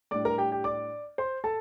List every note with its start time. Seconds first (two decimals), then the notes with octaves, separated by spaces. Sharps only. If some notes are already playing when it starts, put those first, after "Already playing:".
0.11 A2 G3 D4 D5 D6
0.25 A#4 A#5
0.38 G4 G5
0.52 G4 G5
0.64 D5 D6
1.18 C5 C6
1.44 A4 A5